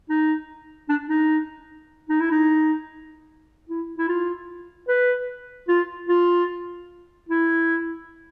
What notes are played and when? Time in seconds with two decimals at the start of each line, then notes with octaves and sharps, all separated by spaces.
0.09 D#4
0.89 D4
1.09 D#4
2.09 D#4
2.20 E4
2.31 D#4
3.69 E4
3.98 E4
4.08 F4
4.88 B4
5.68 F4
6.08 F4
7.29 E4